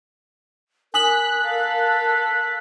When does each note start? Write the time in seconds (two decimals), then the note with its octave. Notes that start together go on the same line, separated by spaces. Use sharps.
0.94 A#4 G#5 D#6 F#6 B6 F#7
1.42 A4 F5